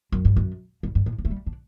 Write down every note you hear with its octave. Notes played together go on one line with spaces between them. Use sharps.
F#2
G2
F#2
G2
G2
A2
E3
A3
G3
D4